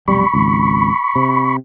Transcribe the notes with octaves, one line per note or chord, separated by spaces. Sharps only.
F1 B1 G3 B5 C#6
G#1 C#2
C3